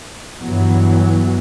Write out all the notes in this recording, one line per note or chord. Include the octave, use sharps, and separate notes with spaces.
G2 E3 F#3 B3